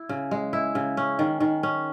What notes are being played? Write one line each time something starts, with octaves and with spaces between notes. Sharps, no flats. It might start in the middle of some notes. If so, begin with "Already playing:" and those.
Already playing: E4
C#3
G#3
E4
C#3
C#4
D#3
D#3
C#4